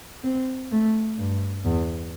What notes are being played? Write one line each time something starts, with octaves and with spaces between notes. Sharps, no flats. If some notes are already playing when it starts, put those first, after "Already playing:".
C4
A3
G2
E2